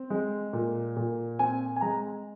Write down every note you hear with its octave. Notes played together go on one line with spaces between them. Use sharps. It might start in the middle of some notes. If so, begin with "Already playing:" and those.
Already playing: C4
G#3
A#2
A#2
C4 G#5
G#5
G#3 A#5